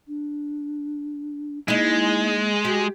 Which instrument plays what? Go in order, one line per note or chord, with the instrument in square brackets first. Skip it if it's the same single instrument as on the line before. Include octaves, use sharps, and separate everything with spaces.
[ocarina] D4
[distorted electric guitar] G#3 [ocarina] A#3 [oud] D#4 E4
[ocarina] F#4 [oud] G4